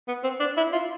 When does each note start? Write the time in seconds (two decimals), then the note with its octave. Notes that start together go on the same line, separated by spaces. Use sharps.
0.08 B3
0.24 C4
0.40 D4
0.57 E4
0.73 F4